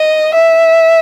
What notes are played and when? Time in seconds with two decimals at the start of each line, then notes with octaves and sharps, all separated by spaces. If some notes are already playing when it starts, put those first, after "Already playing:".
Already playing: D#5
0.34 E5